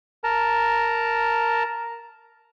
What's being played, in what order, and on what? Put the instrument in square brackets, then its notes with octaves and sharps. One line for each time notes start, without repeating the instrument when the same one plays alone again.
[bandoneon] A#4 A5 A#5